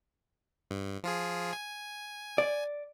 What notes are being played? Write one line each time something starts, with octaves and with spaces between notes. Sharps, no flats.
G2
F3 F4 G#4
G#5
D5